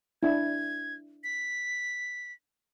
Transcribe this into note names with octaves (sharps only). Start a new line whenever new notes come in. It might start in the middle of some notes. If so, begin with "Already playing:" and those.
D4 E4 G#6
B6